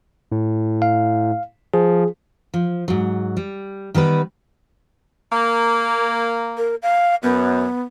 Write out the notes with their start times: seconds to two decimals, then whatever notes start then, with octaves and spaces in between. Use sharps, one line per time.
0.31 A2
0.82 F5
1.74 F3 G#4
2.54 F3
2.88 G#2 F#3
3.37 G3
3.94 D#3 G3 B3 B4
5.32 A#3
6.57 A#4
6.83 F5
7.23 F#2 B3